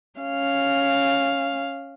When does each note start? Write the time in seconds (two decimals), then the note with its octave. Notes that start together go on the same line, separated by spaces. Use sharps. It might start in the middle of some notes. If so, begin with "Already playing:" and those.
0.20 C#4 F5